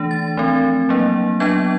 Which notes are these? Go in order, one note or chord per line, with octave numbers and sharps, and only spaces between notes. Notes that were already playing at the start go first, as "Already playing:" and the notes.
Already playing: E3 A3 D4
A6
F3 A3 C4
F#3 A#3 D4
F#3 B3 D4 G#6